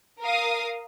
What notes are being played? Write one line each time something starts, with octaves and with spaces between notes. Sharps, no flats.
A#4 F5 D#6